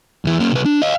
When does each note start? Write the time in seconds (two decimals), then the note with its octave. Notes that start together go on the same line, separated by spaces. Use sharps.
0.25 E2 E3
0.40 A#3 C#4
0.52 C2 B4
0.65 D4
0.82 D#5 F5